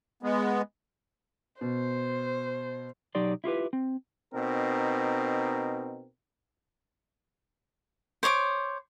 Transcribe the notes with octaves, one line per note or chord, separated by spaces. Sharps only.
G#3 B3
B2 C5
B1 F#3 D#4 G4 D5 C6
E4 F4 G4 B4
C4
B2 C4 D#4 A#4
C5 C#5 D#5 D6